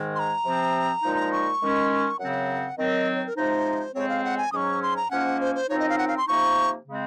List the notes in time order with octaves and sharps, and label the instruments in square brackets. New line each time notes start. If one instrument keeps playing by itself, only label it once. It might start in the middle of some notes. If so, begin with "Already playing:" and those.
Already playing: [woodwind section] G#2 D#3 G#3
[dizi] C6
A#5
[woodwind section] C3 F3 C4
A#2 F3 G#3 D#4
[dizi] C#6
[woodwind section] D#3 G#3 C#4
[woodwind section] F#2 C#3 F#3 C4 [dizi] F#5
[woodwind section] D#3 F#3 C4 [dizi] D#5
[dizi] C#5
A#4
[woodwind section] C3 F3 G#3 D#4 [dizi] C5
[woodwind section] F2 C#3 G#3 C4 [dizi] C#5
[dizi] F5
F#5
G#5
[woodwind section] G#2 F#3 C#4 [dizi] C#6 D#6
[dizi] C6
A#5
[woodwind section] G#2 F3 A#3 C#4 [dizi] F#5
[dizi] C5
C5
[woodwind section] F#2 F3 C4 D#4 [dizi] C#5
[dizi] D#5
F5
F#5
F5
C6
[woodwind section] C3 F3 A#3 D#4 [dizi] C#6
[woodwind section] C#3 G#3 C4